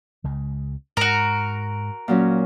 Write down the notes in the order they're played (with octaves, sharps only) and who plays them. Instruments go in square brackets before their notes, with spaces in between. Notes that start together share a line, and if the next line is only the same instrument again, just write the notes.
[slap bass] C#2 C#3 G#3
[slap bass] G#2 [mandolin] F#4 A#4
[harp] A#2 F#3 C#4